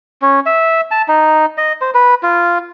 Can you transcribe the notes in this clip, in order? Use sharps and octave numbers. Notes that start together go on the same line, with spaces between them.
C#4
E5
A5
D#4
D#5
C5
B4
F4